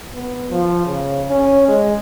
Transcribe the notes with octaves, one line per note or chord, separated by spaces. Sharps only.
B3
F3
C#3
C#4
G#3